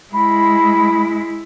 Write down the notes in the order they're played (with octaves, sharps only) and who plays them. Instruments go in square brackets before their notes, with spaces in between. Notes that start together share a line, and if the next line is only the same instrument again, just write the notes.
[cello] G#3 E4 [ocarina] B5